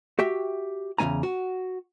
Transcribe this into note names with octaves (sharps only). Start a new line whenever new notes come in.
F#4 G4 E5 G5
E2 C#3 G#3 C#4 G#5 A#5
F#4